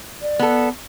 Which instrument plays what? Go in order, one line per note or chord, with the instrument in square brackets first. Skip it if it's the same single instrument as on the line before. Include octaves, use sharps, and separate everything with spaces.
[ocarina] D5
[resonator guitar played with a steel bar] B3 A4